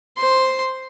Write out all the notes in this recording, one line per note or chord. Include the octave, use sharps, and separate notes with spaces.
C5 C6